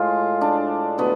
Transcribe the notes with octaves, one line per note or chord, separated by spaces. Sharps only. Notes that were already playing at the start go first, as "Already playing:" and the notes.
Already playing: A2 G#3 F4
D4
D3 F#3 A3 B3